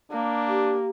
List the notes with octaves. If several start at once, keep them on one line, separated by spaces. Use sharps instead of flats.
A#3 D4
G4